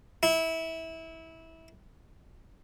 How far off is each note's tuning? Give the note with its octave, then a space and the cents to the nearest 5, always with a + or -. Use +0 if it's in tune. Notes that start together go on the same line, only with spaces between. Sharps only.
E4 -20